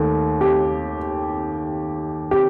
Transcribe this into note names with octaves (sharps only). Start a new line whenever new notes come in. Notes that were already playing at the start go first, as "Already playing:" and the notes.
Already playing: D#2 D#3 A3
G4
G4